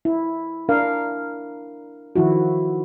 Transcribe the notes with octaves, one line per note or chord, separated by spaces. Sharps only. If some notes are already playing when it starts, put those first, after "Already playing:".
E4
D4 A#4 F5
D#3 F3 E4 F#4